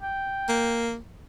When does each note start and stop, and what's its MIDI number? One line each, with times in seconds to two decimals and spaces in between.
0.02 0.88 79
0.49 0.97 58